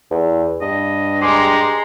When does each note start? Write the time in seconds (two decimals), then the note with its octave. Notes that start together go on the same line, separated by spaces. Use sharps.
0.11 E2
0.61 G2 D#5
1.21 G#3 G4 A#5 C6